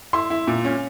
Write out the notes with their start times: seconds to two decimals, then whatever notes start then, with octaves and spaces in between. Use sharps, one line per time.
0.13 E4 C6
0.30 E4
0.47 A#2
0.64 C#4